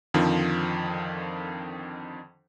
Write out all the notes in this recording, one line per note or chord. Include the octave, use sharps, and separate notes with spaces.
F2 D3 D#3 F3